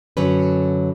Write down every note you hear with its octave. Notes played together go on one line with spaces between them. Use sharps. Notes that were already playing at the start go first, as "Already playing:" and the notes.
F#2 D3 F#3 C#4 B4